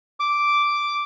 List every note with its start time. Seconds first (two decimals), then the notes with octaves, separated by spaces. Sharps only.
0.20 D6